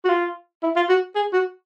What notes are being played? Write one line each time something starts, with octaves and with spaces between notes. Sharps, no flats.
F#4
F4
E4
F4
F#4
G#4
F#4